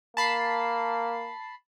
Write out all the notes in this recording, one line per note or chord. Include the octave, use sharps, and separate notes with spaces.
A#3 A5 B5 C7